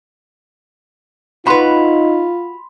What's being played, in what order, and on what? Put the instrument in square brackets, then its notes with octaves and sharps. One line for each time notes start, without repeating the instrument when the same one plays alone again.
[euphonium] D#4 [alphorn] F4 [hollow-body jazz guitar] F#4 B4 [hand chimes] B5 C6